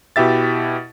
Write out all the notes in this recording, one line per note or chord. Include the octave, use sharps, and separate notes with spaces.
B2 E4 G4 E5 A6